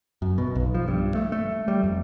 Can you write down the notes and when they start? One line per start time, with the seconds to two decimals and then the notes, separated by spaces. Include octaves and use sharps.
0.22 F#2
0.38 B2
0.55 B1
0.75 F3
0.88 G2
1.15 A3
1.32 A3
1.68 G3
1.83 F2